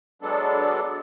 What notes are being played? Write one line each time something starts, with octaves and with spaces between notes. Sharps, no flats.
F#3 G#3 B3 D4 A4